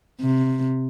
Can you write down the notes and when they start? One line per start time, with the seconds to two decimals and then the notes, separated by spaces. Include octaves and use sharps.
0.21 C3